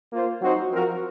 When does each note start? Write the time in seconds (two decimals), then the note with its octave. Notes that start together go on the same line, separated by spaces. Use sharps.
0.10 A#3 F4 C5
0.41 F#3 C4 D#4 F#4 C5
0.71 F3 C4 F#4 A#4